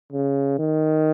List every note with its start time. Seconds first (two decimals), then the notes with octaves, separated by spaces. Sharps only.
0.12 C#3
0.59 D#3